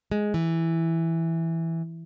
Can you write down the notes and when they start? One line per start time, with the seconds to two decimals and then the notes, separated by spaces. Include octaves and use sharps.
0.12 G#3
0.34 E3